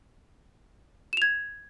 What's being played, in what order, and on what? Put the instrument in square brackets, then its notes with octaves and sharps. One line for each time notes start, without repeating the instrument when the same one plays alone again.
[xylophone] E7
F7
G#6